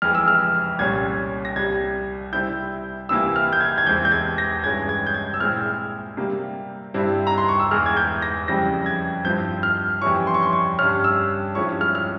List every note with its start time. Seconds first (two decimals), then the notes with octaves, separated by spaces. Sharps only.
0.02 F2 E3 G#3 F6
0.15 E6
0.28 F6
0.79 C2 A#2 G3 C#4 G#6
1.45 A#6
1.56 C2 C3 G3 G#6
2.33 C3 G3 C4 E4 G6
3.09 C2 C3 E3 A#3 E4 E6
3.36 F6
3.53 G6
3.61 G#6
3.78 G#6
3.86 E2 E3 G#3 C4 E4 G6
4.05 G6
4.12 G#6
4.38 A#6
4.64 G2 E3 G#3 C#4 G#6
4.89 G#6
5.07 G6
5.14 G#6
5.34 E6
5.40 A#2 G#3 C4 E4 F6
6.17 C3 G3 A#3
6.94 G2 G3 C4 E4
7.27 A#5
7.38 C6
7.49 C#6
7.60 E6
7.71 E2 E3 G#3 F6
7.86 G#6
7.97 G6
8.22 A#6
8.48 F2 C#3 G3 C4 E4 A#6
8.86 G#6
9.24 G2 F3 C4 E4 G6
9.63 F6
10.02 F2 E3 G3 C#4 E4 C#6
10.27 C6
10.34 C#6
10.42 C6
10.53 C#6
10.79 G2 G3 C#4 F6
11.04 E6
11.55 G2 F3 G#3 C#4 E4 C#6
11.81 F6
11.95 F6